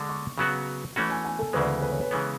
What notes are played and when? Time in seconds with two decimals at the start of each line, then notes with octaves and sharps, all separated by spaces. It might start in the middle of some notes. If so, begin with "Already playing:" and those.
Already playing: D3 G#3 D4
0.09 C#6
0.38 C#3 F#3 B3 F#4
0.96 E3 A3 C#4 F#4 B5
1.10 G#5
1.25 G#5
1.39 A4
1.53 D2 C#3 E3 G#3 B4
1.82 B4
1.92 C#5
2.01 B4
2.11 C#3 E3 G#3 B3